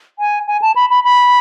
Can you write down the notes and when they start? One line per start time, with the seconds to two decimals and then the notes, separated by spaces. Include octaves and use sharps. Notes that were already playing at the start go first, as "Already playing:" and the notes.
0.19 G#5
0.47 G#5
0.62 A5
0.76 B5
0.90 B5
1.04 B5